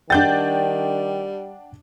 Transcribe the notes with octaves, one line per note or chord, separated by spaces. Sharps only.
D#3 G3 D4 F#5 G5 G6 A6